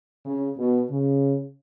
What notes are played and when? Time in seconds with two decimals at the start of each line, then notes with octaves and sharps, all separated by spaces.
0.26 C#3
0.58 B2
0.90 C#3